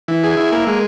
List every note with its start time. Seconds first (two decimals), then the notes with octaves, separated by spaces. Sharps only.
0.08 E3
0.24 G#4
0.37 E4
0.52 A#3
0.67 G#3